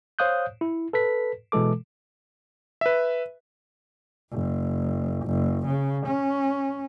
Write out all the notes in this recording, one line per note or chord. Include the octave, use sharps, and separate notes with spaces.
C5 C#5 F5 D#6 F#6 G6
E4
A4 B4 B6
B2 E3 G#3 A4 D6
B4 E5
F#1
F#1
C#3
C#4